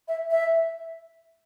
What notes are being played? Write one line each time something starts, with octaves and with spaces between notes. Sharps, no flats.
E5
E5